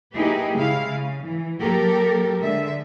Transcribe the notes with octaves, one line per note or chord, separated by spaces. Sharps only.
A#3 D#4 E4 G4 G#4 B4
C#3 G#3 E4 F5
C#3
E3
F#3 A#3 G4 A4 A#4
D3 G#3 E5